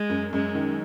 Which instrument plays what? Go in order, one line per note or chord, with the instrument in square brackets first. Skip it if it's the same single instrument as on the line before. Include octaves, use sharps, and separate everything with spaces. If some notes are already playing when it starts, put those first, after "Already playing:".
Already playing: [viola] G#3
[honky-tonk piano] F#2
[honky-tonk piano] F#2 [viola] G#3
[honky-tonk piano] D#3